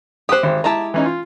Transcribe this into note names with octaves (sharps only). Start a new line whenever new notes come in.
G4 C5 D#6 F#6
G#1
G#3 E4 G4 A5 A#5
E3 C#4 D#4
F4